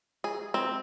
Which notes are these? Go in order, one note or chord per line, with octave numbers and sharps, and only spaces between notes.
G#4
C4